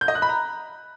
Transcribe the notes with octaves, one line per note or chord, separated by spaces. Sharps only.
G6
D#5
F#6
B5
A#5